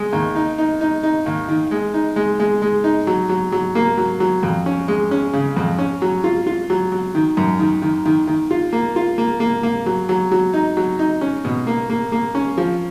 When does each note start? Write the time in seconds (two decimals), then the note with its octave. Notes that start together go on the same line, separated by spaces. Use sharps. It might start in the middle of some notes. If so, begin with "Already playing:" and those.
Already playing: G#3
0.13 D#2
0.36 D#4
0.58 D#4
0.81 D#4
1.03 D#4
1.26 D#2
1.48 D#3
1.71 G#3
1.94 D#4
2.16 G#3
2.40 G#3
2.62 G#3
2.84 D#4
3.07 F#3
3.29 F#3
3.52 F#3
3.75 A#3
3.98 F#3
4.20 F#3
4.43 F2
4.66 C#4
4.88 G#3
5.11 C#4
5.33 C#3
5.56 F2
5.79 C#4
6.02 F#3
6.24 F4
6.47 F4
6.70 F#3
6.92 F#3
7.15 D#3
7.37 F#2
7.59 D#3
7.82 D#3
8.06 D#3
8.27 D#3
8.51 F4
8.73 A#3
8.96 F4
9.18 A#3
9.40 A#3
9.63 A#3
9.86 F#3
10.09 F#3
10.31 F#3
10.53 D#4
10.77 F#3
10.99 D#4
11.21 C#4
11.45 B2
11.67 A#3
11.90 A#3
12.12 A#3
12.35 C#4
12.58 F3